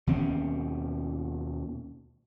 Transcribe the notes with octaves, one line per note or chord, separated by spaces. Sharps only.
D#2 B2 C4 C#4